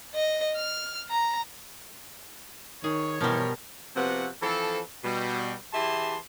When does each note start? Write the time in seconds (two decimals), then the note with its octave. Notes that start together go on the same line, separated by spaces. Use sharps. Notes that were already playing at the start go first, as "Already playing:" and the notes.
0.14 D#5
0.56 F6
1.09 A#5
2.84 D#3 G#4 C#5
3.21 B2 E3 F3 G3 A#4
3.95 C3 F3 B3 C4 F#4 F#5
4.42 E3 F3 C4 A4
5.04 B2 G3
5.73 E3 G4 G#4 E5 A5 C6